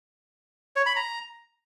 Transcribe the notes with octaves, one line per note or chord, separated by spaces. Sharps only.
C#5
B5
A#5